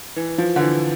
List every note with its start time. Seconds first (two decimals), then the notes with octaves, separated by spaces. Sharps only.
0.16 E3
0.38 F3
0.56 D3
0.61 E3